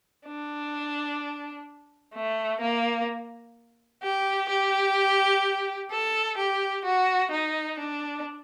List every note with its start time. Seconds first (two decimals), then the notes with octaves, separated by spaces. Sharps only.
0.26 D4
2.14 A3
2.61 A#3
4.02 G4
4.49 G4
5.91 A4
6.37 G4
6.85 F#4
7.31 D#4
7.79 D4